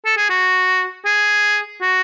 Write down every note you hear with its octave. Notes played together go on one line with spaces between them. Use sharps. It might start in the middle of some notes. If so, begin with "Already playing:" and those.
A4
G#4
F#4
G#4
F#4